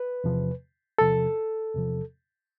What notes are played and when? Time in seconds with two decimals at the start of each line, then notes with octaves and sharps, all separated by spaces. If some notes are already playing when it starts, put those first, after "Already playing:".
Already playing: B4
0.24 E2 C3 F3
0.98 E2 C3 F3 A4
1.74 E2 C3 F3